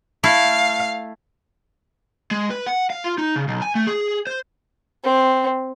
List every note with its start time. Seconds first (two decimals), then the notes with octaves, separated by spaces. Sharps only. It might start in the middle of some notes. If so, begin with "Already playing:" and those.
0.24 A3 E4 F5
2.31 G#3
2.50 B4
2.66 F#5
2.90 F5
3.04 F4
3.18 D#4
3.36 C#3
3.48 B1
3.62 G#5
3.75 A3
3.87 G#4
4.27 C5
5.04 C4